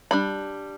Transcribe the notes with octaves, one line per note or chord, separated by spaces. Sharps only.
G3 D4 B5